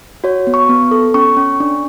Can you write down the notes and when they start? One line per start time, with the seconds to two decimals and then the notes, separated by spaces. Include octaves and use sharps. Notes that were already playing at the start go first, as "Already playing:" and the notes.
0.24 F#4 C#5
0.47 B3
0.54 C#6
0.69 B3
0.91 A4
1.14 C#4 C#6
1.37 C#4
1.60 D4